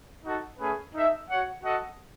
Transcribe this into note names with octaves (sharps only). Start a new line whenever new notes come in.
D#4 F#4 A4
A3 C#4 G#4 B4
D#4 A4 E5
F#4 C#5 F#5
F#4 A4 D#5 F#5